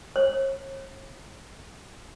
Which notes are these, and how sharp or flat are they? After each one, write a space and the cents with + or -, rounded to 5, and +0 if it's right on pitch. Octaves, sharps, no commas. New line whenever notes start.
C#5 -45